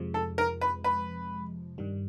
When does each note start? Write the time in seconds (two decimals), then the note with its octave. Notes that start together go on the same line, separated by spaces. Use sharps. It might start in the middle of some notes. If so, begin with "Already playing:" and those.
Already playing: F2 C3 F3 G#3
0.14 A4
0.38 A#4
0.61 B4
0.84 B4
1.78 G2 D#3 G3